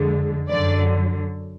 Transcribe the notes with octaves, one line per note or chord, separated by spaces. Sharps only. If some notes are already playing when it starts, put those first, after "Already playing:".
Already playing: F2 D3 G#3
F#2 D3 F#3 D5